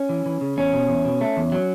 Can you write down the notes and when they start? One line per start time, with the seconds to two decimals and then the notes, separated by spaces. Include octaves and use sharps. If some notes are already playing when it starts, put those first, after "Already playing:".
Already playing: C#4
0.09 E3
0.26 E3
0.41 C#3
0.57 E2 C#4
0.73 B2
0.89 E2
1.05 B2
1.21 A3
1.37 E2
1.52 F#3